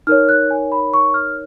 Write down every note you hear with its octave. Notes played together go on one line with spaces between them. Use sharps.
D#4 A#4 C#5 F6
F#6
G#5
B5
C#6
F6